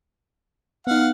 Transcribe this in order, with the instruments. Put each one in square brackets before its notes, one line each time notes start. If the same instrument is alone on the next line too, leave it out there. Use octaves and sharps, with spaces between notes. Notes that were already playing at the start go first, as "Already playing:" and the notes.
[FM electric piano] B3 D#4 [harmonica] F5 F#5